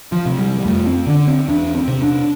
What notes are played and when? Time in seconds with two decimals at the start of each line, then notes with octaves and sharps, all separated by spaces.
0.12 F3
0.26 C3
0.39 G3
0.58 G3
0.65 F2 A3
0.87 C4
1.07 D3 D4
1.28 C4
1.48 E2 D4
1.75 C4
1.88 C3
2.02 D4